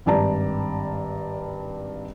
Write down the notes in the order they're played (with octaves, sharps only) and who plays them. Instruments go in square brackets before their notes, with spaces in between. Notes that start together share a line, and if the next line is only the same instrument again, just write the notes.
[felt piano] G#1 G2 D5 A5 A#5